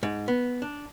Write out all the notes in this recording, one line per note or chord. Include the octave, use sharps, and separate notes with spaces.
G#2
B3
D4